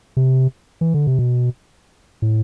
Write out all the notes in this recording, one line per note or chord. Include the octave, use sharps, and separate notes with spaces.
C3
E3
D3
C3
B2
A2